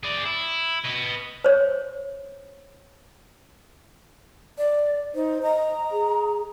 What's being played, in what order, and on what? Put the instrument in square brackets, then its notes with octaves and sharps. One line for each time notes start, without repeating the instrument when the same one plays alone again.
[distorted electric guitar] G#4 D5
E4
B4 D#5
[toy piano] C5 C#5
[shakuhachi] D5
[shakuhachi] D#4 [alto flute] C5
[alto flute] D#5 [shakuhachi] A#5
[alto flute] G#4